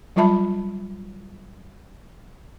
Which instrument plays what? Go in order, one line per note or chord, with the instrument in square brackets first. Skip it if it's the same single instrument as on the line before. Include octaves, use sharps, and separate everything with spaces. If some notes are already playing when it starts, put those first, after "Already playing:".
[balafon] F#3 G3 F4 E5 A5 B5